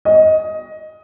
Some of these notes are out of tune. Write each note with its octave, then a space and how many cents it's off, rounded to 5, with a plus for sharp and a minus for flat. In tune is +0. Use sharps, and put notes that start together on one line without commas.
D#5 +15